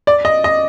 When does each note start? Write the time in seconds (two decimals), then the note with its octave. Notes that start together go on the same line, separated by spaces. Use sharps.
0.07 D5
0.25 D#5
0.44 D#5